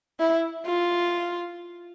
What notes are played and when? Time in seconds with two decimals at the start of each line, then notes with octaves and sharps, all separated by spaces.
0.19 E4
0.66 F4